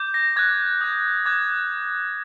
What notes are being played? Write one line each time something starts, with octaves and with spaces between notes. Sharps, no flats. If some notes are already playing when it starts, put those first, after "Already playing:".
Already playing: D6 G6
A#6
D6 F#6 G#6
D#6 G6
D6 F#6 G#6